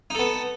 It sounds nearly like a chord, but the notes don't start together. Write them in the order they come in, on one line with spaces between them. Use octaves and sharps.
D#4 A4 B3